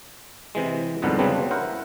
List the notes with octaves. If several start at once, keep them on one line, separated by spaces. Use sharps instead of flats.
C3 E3 G#3
C2 F2 G#2 D3 B3
C#3 F#3 G3 B3 C4 D4
E4 A#4 C5 F#5